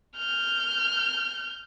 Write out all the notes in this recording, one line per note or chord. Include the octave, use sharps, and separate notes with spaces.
F6 G6